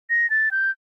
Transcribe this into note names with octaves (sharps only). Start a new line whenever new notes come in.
A#6
A6
G6